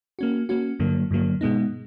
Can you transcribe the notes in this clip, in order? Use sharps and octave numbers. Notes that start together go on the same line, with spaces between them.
A#3 C#4 F#4
A#3 C#4 F#4
G2 D3 F#3 A#3
G2 D3 F#3 A#3
B2 G#3 B3 D#4